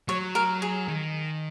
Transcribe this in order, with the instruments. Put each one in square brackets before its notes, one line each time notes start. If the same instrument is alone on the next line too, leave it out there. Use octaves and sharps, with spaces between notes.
[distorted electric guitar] F#3 [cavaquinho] C#5
[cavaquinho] A#4
G#4
[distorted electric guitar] D#3